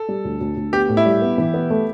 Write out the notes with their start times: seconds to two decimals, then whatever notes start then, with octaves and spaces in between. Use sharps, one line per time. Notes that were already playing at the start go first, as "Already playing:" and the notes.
Already playing: A4
0.08 G3
0.25 D2
0.41 D2
0.57 D2
0.73 B3 G4
0.89 A2
0.97 E4
1.06 G3
1.22 B3
1.38 E3
1.54 B3
1.70 A3